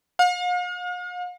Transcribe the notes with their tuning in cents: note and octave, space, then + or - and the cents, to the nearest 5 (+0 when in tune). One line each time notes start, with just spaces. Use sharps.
F5 +45